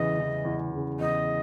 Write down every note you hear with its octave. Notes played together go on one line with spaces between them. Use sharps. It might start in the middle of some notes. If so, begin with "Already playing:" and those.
Already playing: E2 C#3 E3 D#5
C#3 E3
E2
C#3 E3
E2 D#5